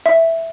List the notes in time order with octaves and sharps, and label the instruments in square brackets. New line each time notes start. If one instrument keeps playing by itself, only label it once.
[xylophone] E5